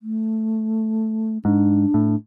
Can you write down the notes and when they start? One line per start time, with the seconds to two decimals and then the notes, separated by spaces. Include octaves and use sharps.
0.02 A3
1.45 G#2 D4
1.94 A2